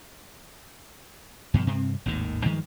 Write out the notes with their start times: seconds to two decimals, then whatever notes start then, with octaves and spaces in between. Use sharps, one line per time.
1.54 G2 B2 D#3 F3
1.67 G2 C3 C4
2.06 G#1 D#2 A2 D#3
2.45 G2 D#3 F3 G#3